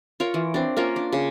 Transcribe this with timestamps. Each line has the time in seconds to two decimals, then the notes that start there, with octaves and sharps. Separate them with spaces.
0.20 F4 A#4 C#5
0.34 E3
0.54 C4 D4
0.77 A#3 C#4 F4 A#4
0.96 D4
1.13 C#3